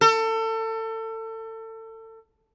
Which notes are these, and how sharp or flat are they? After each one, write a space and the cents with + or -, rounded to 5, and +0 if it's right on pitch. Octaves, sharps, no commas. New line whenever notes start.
A4 +30